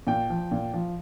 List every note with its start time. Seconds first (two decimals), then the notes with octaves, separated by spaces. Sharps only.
0.07 A#2 G5
0.30 F3
0.51 A#2
0.74 F3